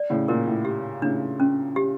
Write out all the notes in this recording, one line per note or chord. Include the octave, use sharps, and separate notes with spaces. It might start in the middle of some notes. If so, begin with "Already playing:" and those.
Already playing: D5
A2 C#3
A#2 A#4
A2
G4
A2 C#3 D4
C#4
G4